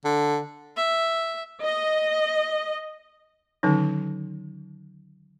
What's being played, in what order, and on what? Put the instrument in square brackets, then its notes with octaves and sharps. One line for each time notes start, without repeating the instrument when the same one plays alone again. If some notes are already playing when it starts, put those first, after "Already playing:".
[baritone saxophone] D3
[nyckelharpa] E5
[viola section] D#5
[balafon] D3 D#3 F#3 C#4 D#4